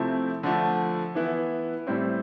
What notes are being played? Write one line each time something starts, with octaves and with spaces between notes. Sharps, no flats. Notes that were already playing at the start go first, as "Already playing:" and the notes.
Already playing: C3 F3 A3 C4 E4
D3 F3 A3
E3 B3 E4
A2 G3 C4 E4